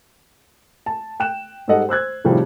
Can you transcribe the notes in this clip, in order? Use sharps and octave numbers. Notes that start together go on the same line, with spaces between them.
A5
G5 F#6 E7
G#2 G3 A4 D#5 F#5
C5 E6 F#6 G#6
A2 C3 D#3 F3 G3 G#4